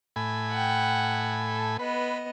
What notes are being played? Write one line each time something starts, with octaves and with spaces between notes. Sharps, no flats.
A2 G#5 B5
F#5 G5
A4
B3 B4 D#5